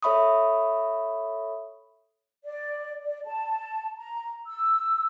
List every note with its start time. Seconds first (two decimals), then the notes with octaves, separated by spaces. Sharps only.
0.03 A4 C#5 E5 B5 C#6 D#6
2.44 D5
3.04 D5
3.26 A5
3.98 A#5
4.47 E6